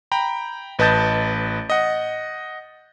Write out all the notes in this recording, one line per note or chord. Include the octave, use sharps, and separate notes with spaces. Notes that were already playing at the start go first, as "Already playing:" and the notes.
G5 A#5 B5
A1 B4 D#5 A5 G6 A6
D#5 F#5